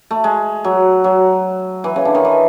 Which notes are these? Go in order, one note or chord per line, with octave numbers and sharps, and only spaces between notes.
A3
G#3
F#3
F#3
E3
C#3
D3
D#3
E3